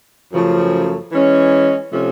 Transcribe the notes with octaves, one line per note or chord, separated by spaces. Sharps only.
F#2 C#3 F3 A3
E3 G#3 C#4
C3 F3 A3 C#4